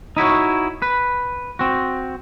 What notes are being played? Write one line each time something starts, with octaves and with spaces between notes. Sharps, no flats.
D#4 E4 F#4 C#5
B4
C4 F#4